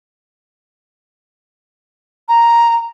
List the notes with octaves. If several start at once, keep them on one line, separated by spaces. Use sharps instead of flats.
A#5